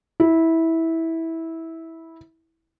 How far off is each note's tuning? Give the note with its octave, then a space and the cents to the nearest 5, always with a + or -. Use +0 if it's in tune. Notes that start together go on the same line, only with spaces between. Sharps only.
E4 -15